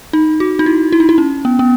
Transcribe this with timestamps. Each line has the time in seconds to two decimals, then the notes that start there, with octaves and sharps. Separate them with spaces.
0.13 D#4
0.40 F#4
0.59 D#4
0.66 E4
0.92 E4
1.00 D#4
1.09 E4
1.18 C#4
1.45 B3
1.59 B3